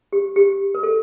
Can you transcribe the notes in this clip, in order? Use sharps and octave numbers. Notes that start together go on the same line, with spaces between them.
G4
G4
A#4
A4